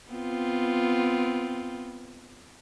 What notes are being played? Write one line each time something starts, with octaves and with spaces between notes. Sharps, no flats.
B3 C4 F4